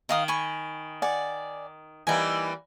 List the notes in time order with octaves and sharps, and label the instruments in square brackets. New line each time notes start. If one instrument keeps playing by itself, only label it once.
[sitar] D#3 [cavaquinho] D#4 F5 D#6
[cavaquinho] G#5 B5 C#6
D5 F#5 G#5
[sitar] E3 G3 A#3 [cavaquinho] D#4 G#5